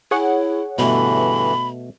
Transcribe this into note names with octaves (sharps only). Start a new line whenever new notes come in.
E4 G#4 C#5 F#5
G2 B2 D3 E3 A3 B5